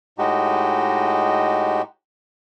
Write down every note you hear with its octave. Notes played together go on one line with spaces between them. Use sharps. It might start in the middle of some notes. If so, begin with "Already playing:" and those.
A2 G#3 D#4 F#4 G4